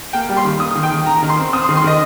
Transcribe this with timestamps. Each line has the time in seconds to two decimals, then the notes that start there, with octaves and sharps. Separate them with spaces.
0.13 A#3 G5
0.29 G3
0.37 C6
0.45 D#3
0.60 A#3 D#6
0.75 D#3
0.83 G5
0.91 D#3
1.06 D#3 A#5
1.23 D#3
1.29 C6
1.37 C4
1.53 C4 D#6
1.64 C6
1.69 D#3
1.76 C6
1.84 D#3 D#5